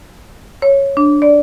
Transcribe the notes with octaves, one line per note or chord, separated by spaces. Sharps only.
C#5
D4
D5